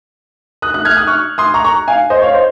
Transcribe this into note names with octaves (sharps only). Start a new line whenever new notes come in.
D#6 F#6
D#6 F#6
F6 G#6
D#6 F#6
C#6 F6
C6 D#6
A#5 C#6
A#5 C#6
F5 G#5
C5 D#5
C#5 F5
C5 D#5